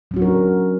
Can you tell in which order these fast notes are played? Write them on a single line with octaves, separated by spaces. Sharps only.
F#3 C#4 F#4 D4 A#4